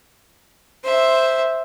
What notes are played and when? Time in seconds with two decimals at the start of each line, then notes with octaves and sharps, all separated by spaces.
0.84 C5 E5